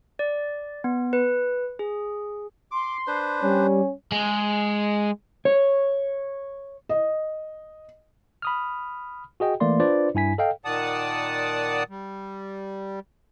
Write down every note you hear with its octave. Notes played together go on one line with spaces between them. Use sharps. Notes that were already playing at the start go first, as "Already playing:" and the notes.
D5
B3
B4
G#4
C6 D6
D4 B4 C5
G3 C#4
G#3
C#5
D#5
B5 D#6 F6
F#4 G#4 D#5 G5
E3 A3 A#3 D5 C6
D4 F4 B4 C5 D5
G2 E4 G#5 B6
A4 D#5 F5 G5
A#2 D#3 D5 F#5 A5 D#6
G3